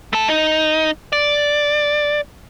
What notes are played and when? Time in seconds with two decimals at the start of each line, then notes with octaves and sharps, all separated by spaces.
0.13 A3 A4
0.28 D#4
1.13 D5